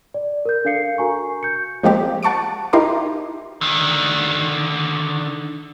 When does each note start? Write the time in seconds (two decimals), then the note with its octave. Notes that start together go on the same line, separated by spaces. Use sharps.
0.14 D5
0.45 A#4 G6
0.65 D4 A4 F5 C7 C#7
0.98 F#4 A#4 G#5 A#5 C#6
1.43 G6 C#7
1.83 F3 G#3 A#3 C4 G4
2.23 F#5 A5 C#6 D6 D7
2.73 D#4 E4 G4 A#4 C6 D6
3.61 D3 D#3